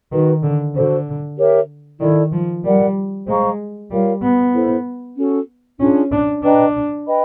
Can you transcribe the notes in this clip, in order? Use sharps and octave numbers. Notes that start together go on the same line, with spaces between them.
D#3 D#4 F#4 B4
D3
D3 F#4 A4 C5
G4 A#4 C#5 E5
D#3 E4 A4 D5
F3
G3 A#4 D5 F#5
G#3 C5 F5 A#5 C#6
G3 F4 A#4 C#5 F5
B3
E4 A4 C5
C#4 F#4 A4
C#4 D4 F4 G#4
D4
D4 B4 D#5 G5 A#5
B4 D#5 G5 B5